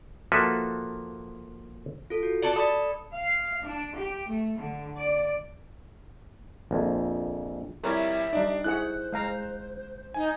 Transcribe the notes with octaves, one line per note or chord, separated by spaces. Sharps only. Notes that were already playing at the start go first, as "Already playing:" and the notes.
F3 A#3 F#4 A4 B4 E5
F4 A4
F#4
A4 B4 D5
A4 D5 B5 D#6
F5
D4
G4
A3
D3
D5
A#1 F2
F2 G3 E4 A#4 C#5 E5
G3 D4 D#4 D5
E4 G#4 C5 F#5 F#6
G#3 F5 A#5
D#4 G#5